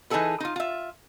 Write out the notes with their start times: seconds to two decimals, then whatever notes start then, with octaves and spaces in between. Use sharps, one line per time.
0.10 E3 D#4 F4 G#4 A4 B4
0.40 D#4 F4
0.56 F4 E5